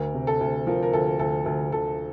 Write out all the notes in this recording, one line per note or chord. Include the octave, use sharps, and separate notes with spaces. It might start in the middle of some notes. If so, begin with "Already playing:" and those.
Already playing: D2 A#4
C3
A4
D2
F3 A#4
A#4
D2 A4
D2 A4
D2 A4
D2 A4